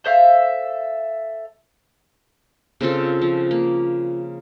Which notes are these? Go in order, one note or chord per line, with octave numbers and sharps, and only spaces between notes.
A4 C5 E5 F5
C#3 C4 F4 A4
F3
A#3